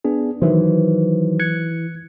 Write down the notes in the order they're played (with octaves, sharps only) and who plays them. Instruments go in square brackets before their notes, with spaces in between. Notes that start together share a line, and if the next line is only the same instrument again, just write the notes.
[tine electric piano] B3 D4 G#4
[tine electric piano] D#3 F#3 C5 [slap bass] E3
[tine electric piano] F#6 G#6 C#7